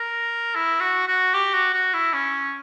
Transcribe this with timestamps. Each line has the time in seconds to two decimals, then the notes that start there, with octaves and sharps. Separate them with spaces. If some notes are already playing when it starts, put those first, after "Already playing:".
Already playing: A#4
0.55 E4
0.80 F#4
1.08 F#4
1.34 G4
1.53 F#4
1.74 F#4
1.94 E4
2.13 C#4